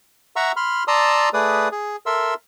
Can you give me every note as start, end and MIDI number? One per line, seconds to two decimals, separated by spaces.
0.36 0.52 76
0.36 0.52 78
0.36 0.52 82
0.36 0.52 85
0.36 0.52 88
0.56 0.84 83
0.56 0.84 84
0.56 0.84 89
0.88 1.29 74
0.88 1.29 81
0.88 1.29 82
0.88 1.29 84
0.88 1.29 87
0.88 1.29 88
1.34 1.68 57
1.34 1.68 68
1.34 1.68 71
1.34 1.68 74
1.34 1.68 87
1.72 1.96 68
2.06 2.34 69
2.06 2.34 70
2.06 2.34 76
2.06 2.34 84
2.06 2.34 88